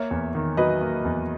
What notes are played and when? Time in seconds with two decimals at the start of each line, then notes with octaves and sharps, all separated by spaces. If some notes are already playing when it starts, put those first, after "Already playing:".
Already playing: A#3 C#5 E5
0.11 E2
0.35 D#3
0.57 F#3 B4 D#5
0.81 A#3
1.05 E2